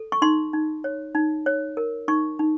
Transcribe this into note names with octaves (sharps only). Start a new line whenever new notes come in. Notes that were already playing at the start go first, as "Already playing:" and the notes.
Already playing: A4
C#6
D#4 C6
D#4
C#5
D#4
C#5
A#4
D#4 C#6
D#4